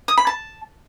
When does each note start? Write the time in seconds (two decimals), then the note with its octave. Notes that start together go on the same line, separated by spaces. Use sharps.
0.08 D#6
0.18 B5
0.27 A5